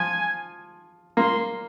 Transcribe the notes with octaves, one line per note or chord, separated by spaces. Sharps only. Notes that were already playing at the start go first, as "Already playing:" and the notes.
Already playing: F3 G#5
A#3 C6